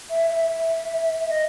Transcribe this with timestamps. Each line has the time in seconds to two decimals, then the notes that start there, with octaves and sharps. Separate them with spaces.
0.10 E5
0.30 E5
1.28 D#5